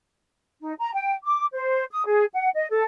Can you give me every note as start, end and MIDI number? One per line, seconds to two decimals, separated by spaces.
0.61 0.73 63
0.78 0.90 82
0.93 1.13 79
1.24 1.45 86
1.53 1.85 72
1.91 2.05 87
2.06 2.25 68
2.34 2.49 78
2.55 2.68 75
2.70 2.83 69